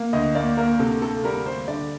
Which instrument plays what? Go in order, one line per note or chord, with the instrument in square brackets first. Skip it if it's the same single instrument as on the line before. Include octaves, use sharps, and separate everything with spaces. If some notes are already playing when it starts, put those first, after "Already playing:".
Already playing: [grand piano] A#3
[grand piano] D2 [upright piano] D#5
[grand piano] A#3 [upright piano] D5
[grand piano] A#3 [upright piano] A#4
[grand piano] C3 [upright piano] A4
[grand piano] C3 [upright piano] A4
[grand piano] G3 [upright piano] A#4
[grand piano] G3 [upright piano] C5
[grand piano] D3 [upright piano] D5